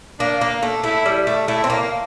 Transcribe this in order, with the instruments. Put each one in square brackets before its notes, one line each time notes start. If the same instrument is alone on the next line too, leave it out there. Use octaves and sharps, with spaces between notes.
[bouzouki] A#3 [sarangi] D4
[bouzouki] A#3
A3
[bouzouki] A3 [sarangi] E4
[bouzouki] G3
A3
[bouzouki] A3 [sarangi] E4
[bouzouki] C4
A#3